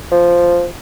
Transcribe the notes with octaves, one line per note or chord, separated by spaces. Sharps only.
F3